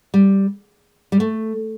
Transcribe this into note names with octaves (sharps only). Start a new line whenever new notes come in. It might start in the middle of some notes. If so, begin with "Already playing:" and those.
G3
G3
A3